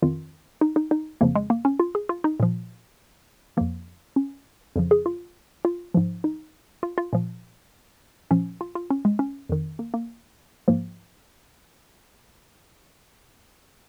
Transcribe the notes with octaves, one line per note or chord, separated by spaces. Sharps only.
F2 D#3 F4
D#4
D#4
D#4
F2 C#3 F3 A#3
G#3
A#3
C#4
F4
G#4
F4
D#4
A#2 F3
F2 F3 A#3
C#4
F2 C#3 F3
G#4
F4
F4
G#2 F3
D#4
F4
F4
A#2 F3
A#2 F3 C#4
F4
F4
C#4
G#3
C#4
F2 D#3
A#3
A#3
G#2 F3 A#3